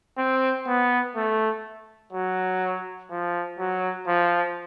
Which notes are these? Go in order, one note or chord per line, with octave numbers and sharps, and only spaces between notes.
C4
B3
A3
F#3
F3
F#3
F3